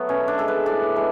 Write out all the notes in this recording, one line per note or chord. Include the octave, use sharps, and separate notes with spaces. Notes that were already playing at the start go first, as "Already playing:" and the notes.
Already playing: F#3 A3 B3
B2 C#4
D4
G#3 A4
B4
A2 D5
E3 G#3